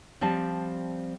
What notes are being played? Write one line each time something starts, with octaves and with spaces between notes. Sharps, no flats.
F3 G3 C4 A5